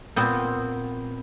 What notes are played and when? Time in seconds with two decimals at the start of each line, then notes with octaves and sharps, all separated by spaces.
0.16 A#2 B3 C4